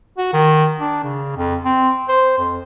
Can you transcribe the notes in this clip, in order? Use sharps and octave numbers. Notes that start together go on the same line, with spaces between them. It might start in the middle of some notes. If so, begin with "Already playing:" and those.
F#4
D#3
D4
C#3
F2
C4
C5
F2